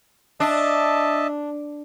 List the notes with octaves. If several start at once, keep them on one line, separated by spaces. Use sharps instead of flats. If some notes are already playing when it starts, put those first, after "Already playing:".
D4 D#5 E5 A5